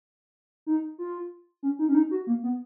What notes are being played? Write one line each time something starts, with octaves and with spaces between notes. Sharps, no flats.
D#4
F4
C#4
D#4
C#4
D#4
F#4
A#3
B3